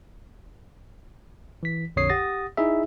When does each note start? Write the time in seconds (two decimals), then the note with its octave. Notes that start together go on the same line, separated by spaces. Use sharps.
1.63 E3 B6
1.96 A#1 F2 D3 C#5 D#6 C7
2.09 G4 F#5 D#6 A6 A#6
2.57 D#4 E4 G#4 E5